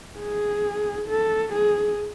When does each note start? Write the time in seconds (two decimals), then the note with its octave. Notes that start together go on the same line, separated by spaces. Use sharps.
0.20 G#4
1.08 A4
1.52 G#4